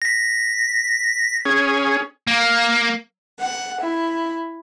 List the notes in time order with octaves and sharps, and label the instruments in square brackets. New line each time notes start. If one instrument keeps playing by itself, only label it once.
[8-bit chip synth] A#6 B6
[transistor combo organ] C#4 G#4
[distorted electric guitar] A#3
[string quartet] F#5
E4